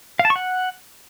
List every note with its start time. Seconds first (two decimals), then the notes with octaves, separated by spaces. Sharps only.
0.19 F5
0.25 A5
0.30 C#6
0.36 F#5